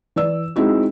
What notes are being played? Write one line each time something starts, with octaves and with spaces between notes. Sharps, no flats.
E3 D5 E6
G#3 C4 D#4 E4 F#4